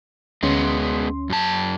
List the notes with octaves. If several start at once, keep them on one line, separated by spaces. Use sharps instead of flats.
D2 G#3 B3 C#4 C6
F#2 A5